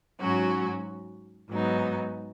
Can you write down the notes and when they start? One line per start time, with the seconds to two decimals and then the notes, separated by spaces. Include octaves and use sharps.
0.20 G#2 F#3 C#4 F#4
1.49 G#2 F#3 B3 D#4